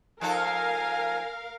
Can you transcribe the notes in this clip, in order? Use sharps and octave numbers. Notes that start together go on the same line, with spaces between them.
F3 D#4 A4 A#4 F5 G#5